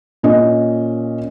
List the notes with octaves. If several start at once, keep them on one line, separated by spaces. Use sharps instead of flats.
A#2 C#4 D#5